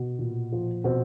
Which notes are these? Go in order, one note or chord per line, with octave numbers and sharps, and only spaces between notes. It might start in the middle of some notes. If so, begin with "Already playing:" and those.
Already playing: B2
A#2
F3
B2 C4